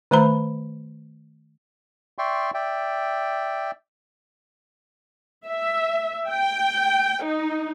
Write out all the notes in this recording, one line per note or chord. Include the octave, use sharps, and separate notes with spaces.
D#3 A3 C5 A#5 B5
D5 E5 G5 C6 C#6
D5 E5 G5
E5
G5
D#4